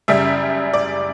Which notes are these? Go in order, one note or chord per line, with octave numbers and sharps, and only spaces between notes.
F#2 C#3 G3 E5
D5